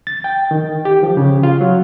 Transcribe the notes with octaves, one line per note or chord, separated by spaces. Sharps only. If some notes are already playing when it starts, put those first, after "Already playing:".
A6
G5
D#3
G4
F3
C#3
F4
F#3